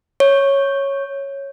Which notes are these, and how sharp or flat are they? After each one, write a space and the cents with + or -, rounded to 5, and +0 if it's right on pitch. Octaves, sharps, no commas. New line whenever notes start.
C#5 -5